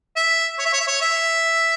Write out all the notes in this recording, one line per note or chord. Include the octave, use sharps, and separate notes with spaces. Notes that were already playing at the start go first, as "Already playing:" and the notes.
E5
C#5
E5
C#5
E5
C#5
E5